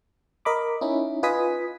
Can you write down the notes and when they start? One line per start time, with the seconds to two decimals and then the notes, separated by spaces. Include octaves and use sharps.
0.45 A#4 D#5 B5 D6
0.81 C#4 D#4 E4
1.23 F4 B4 D#5 G#5 D#6 B6